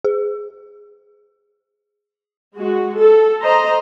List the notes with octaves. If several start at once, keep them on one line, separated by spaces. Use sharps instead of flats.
G#4
G#3 F#4
A4
C5 D#5 A#5